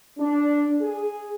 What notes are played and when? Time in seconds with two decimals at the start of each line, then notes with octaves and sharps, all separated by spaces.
0.19 D4
0.82 G#4